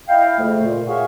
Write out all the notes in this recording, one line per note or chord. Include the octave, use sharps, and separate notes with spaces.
E4 D#5 F5 G5
F2 C#3 A3
A#2
F#4 G#4 C#5 E5 F5